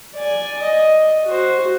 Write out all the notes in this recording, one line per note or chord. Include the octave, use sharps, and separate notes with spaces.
D5 G#5
D#5
F#4 C5